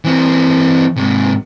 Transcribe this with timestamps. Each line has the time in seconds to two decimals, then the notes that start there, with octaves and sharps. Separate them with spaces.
0.05 E3 C4
0.96 G#2 C3